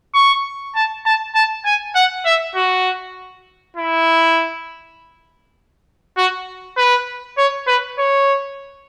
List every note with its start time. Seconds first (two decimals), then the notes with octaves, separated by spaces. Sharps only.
0.14 C#6
0.75 A5
1.05 A5
1.35 A5
1.65 G#5
1.95 F#5
2.25 E5
2.55 F#4
3.76 E4
6.17 F#4
6.77 B4
7.38 C#5
7.67 B4
7.98 C#5